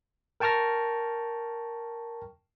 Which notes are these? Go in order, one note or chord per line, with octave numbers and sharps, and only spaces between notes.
A#4 G5 A5 C#6 F6 A#6